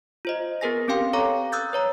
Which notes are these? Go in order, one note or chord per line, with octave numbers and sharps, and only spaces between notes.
F4 C5 D#5
B3 G#4 A#4 B4 G#5 A#6
C4 C#4 G4 F5 G5 C6
A4 C#5 F5 A#5 C#6 D6
D#6 E6 F#6 G6 A6
B4 C#5 A#5